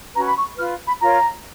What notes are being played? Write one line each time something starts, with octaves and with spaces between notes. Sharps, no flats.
C#4 F#4 B4 A#5
B5
C#6
F4 B4 F6
B5
F4 A#4 C#5 A#5